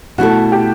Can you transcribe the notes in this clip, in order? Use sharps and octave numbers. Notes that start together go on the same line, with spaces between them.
B2 A3 E4 F#4 A4
G4